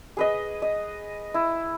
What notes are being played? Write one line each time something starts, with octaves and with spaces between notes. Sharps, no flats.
G#4 B4 D#5
D#5
E4